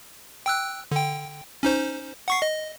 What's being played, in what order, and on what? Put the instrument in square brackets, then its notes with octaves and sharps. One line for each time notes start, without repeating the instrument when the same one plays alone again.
[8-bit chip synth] G5 E6 F#6
D3 G5
C#4 D#4 C5
F#5 C#6 C7
D#5